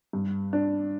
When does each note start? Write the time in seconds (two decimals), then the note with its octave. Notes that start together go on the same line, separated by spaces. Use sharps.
0.13 G2
0.53 D4